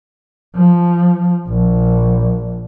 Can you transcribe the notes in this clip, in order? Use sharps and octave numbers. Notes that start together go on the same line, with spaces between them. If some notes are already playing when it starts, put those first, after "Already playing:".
F3
A#1